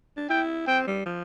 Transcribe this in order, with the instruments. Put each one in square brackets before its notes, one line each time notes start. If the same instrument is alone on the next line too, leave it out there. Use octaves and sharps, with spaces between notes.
[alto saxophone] D4
[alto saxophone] E4 [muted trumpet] G5
[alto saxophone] C4 [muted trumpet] G5
[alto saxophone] G3
F3